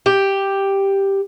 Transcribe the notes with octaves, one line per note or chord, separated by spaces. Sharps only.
G4